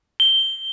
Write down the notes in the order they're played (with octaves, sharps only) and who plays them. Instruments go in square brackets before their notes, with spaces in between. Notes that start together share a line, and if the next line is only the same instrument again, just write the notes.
[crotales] G7